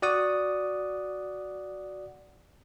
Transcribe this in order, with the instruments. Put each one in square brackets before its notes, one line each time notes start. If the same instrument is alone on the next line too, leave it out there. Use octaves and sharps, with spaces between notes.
[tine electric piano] F#4 D5 F#5 D#6